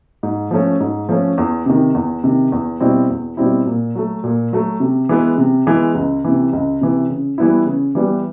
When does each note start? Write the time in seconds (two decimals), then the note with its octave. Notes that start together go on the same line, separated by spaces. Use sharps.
0.23 G#2
0.51 F3 A3 C#4
0.80 G#2
1.09 F3 A3 C#4
1.38 E2
1.66 C3 D#3
1.95 E2
2.24 C3 D#3
2.52 E2
2.80 B2 G3 C4 E4
3.10 E2
3.37 B2 G3 C4 E4
3.66 A#2
3.95 F#3 A3
4.24 A#2
4.53 F#3 A3
4.80 C3
5.09 E3 G#3 B3
5.38 C3
5.67 E3 G#3 B3
5.95 C#2
6.24 C3 E3
6.53 C#2
6.81 C3 E3
7.10 C#3
7.38 E3 G3 B3 E4
7.66 C#3
7.95 E3 G3 B3 E4